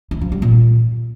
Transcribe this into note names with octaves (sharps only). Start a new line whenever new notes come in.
E3
F3
G3
A#2